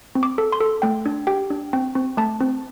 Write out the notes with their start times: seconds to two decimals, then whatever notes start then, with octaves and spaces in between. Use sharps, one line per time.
0.15 C4
0.23 D6
0.38 A4
0.52 C6
0.61 A4
0.82 A3 G5
1.06 D4
1.27 G4 G5
1.50 D4
1.73 C4 G5
1.95 C4
2.17 A3 A5
2.41 C4